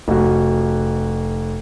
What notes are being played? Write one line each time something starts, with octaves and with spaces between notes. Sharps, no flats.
F1 F#4